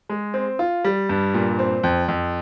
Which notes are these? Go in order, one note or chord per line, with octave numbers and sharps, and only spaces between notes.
G#3
C4
F4
G3
G2
A#2
C4
F2
F2